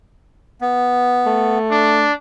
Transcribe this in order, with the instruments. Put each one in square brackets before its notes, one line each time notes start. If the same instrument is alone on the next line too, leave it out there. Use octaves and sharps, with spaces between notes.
[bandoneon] B3
[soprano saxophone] A3
[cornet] D4